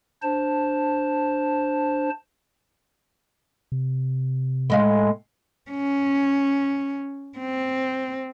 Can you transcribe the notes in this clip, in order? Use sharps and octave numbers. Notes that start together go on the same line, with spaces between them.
D4 C5 A5
C3
A2 G#3 F5
C#4
C4